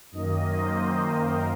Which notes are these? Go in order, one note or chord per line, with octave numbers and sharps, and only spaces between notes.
F#2 D#3 A#3 D#5
C5
A#4